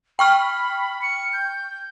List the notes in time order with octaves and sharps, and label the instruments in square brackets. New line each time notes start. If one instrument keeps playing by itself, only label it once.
[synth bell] G5 C#6 F6 [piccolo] B5
[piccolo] C#7
G6